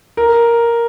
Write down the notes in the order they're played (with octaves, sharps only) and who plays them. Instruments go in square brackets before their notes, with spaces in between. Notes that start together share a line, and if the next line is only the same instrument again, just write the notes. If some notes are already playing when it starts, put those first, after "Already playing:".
[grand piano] A#4